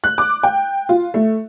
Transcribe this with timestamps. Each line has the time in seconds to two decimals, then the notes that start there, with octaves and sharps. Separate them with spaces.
0.04 F#6
0.18 D6
0.43 G5
0.89 F4
1.14 A3